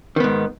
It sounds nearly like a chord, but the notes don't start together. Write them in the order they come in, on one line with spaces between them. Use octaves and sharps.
D#3 B3 G#2